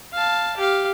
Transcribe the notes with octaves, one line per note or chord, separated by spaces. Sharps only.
F5 A5
G4 F5